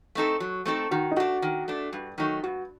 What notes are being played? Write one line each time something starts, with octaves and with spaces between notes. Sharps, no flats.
A3 C4 D#4 A4
F#3 F#4
A3 C4 D#4 A4
D#3 F#4
D#4
A3 D4 F#4
D#3
A3 D4
G2
D#3 F#3 A3 D#4
G2 F#4